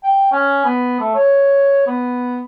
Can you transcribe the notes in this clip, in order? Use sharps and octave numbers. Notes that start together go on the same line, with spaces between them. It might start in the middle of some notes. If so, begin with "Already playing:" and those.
G5
C#4
B3
A3
C#5
B3